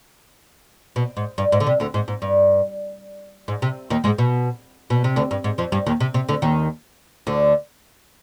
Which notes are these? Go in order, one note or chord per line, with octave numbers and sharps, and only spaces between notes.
B2
G#2
G2
G#2
D3
C3
D2 D3
G#2
G#2
G2
G#2
C3
D#2 D#3
G#2 G#3
B2
B2
C3
D2 D3
G2
G#2
F2 F3
G2 G3
D#2 D#3
C3
C3
D2 D3
D#2 D#3
D2 D3